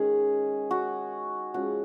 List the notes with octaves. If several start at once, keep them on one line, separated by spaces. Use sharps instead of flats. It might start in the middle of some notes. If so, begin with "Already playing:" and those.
Already playing: D#3 G#3 C#4 G#4
F#4
F3 G#3 C#4 F#4